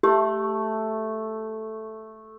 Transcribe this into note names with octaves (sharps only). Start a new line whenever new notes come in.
A3 G4